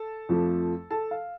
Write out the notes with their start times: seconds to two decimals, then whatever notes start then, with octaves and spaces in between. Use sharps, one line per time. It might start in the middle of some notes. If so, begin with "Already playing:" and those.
Already playing: A4 A5
0.29 F2 F3 A3
0.91 A4 A5
1.11 F5